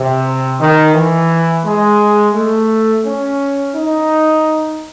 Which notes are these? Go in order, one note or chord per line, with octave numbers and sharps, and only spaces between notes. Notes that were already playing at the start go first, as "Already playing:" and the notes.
Already playing: C3
D#3
E3
G#3
A3
C#4
D#4